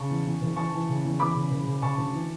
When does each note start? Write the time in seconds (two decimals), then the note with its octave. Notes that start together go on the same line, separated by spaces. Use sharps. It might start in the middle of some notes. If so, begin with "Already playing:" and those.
Already playing: C#3 A5 C#6
0.09 E2
0.25 E2
0.42 F#1
0.56 E3 A5 C#6
0.73 E3
0.88 C#3
1.03 E2
1.19 E2 B5 D6
1.34 C#3
1.51 F#1
1.66 C#3
1.82 C#3 A5 C#6
1.98 D2
2.13 E3